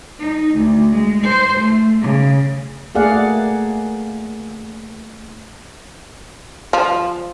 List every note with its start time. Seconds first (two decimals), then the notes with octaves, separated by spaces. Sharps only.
0.18 D#4
0.53 D2
0.91 G#3
1.23 C5
1.60 A3
2.00 C#3
2.95 A3 A#3 G#4 D5 F5 F#5
6.73 F3